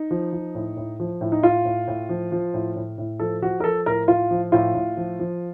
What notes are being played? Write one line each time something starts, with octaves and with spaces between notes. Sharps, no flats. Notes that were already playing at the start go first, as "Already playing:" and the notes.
Already playing: D#4
F3
F3
A2
A2
F3
A2
D#4
A2 F4
A2
A2
F3
F3
A2
A2
A2
F3 A4
F3 F#4
A#4
F3 A4
A2 A#4
A2 F4
F3
A2 F4
A2
F3
F3